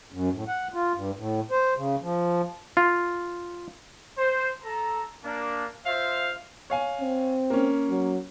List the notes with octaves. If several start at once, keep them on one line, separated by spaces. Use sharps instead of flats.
F#2
A2
F#5
F4
G2
A2
C5
C#3
F3
F4
C5
A4 A#5
A#3 D4
F4 C5 E5 F5
C#5 F5 G#5
C4
A#3 C#4
F#3